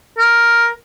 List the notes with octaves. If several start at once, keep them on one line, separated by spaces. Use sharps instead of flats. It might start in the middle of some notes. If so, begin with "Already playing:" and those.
A#4